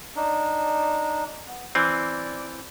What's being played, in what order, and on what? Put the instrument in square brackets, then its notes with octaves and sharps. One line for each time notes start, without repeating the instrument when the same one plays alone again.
[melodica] D4 D#4
B3
[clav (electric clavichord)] E3 C4 [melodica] D5